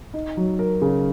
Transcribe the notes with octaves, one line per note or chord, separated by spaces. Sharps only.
D#4
F#3
A#4
C#3